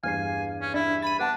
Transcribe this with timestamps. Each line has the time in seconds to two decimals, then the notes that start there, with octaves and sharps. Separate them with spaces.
0.04 E2 G2 F5 G#5 C7
0.61 C#4
0.74 D4 E4 E5
1.02 B5 A6 D#7
1.19 B3 D4 F#5 A5